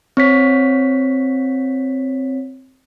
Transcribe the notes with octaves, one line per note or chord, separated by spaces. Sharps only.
C4 C#5 B6